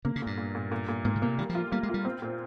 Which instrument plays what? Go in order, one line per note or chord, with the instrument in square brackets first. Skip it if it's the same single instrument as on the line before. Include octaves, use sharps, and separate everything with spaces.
[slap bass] C#3 [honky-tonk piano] A#3
[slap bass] C#3
[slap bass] G2 [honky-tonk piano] A#2
[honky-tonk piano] A#2
A#2
A#2
A#2
[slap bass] G#2 [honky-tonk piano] A#3
[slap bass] C#3
[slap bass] C3 [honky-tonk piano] A#3
[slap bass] D#3 [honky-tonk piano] G3
[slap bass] F3
[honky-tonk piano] F4
[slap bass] G3 [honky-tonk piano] A#3
[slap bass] G#3
[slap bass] G3 [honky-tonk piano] F4
[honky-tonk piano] C4
A#2